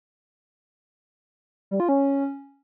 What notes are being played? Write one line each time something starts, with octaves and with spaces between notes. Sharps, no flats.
G3
F4
C#4